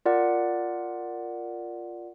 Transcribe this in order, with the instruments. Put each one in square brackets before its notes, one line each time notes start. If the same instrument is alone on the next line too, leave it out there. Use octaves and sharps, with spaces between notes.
[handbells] F4 A#4 D5 F#5